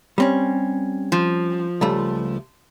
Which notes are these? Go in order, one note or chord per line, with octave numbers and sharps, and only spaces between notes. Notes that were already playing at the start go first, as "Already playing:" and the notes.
G3 C4 C#4
F3
C#2 G3 A3